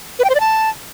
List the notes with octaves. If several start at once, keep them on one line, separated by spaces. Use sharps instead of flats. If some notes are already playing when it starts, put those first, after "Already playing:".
B4
G5
C5
D5
A5